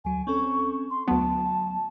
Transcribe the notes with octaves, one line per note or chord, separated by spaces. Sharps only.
D2 F#3 G#5
C4 C#4 A4 C#6
C6
D2 F#3 B3 A5